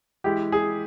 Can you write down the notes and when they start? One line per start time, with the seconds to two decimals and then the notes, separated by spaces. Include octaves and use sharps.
0.24 E3 G#3 E4 G4
0.52 G#4